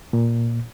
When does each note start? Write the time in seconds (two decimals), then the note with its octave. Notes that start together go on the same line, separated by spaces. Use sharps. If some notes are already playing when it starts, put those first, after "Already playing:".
0.13 A#2